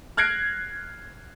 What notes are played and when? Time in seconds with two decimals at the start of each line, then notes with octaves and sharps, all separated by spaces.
0.17 F6 F#6 G#6 A#6 C7 D7